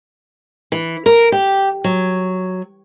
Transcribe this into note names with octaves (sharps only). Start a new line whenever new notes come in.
E3
A#4
G4
F#3